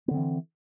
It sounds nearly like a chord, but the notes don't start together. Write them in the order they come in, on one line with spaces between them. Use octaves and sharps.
B3 D3 C4 E3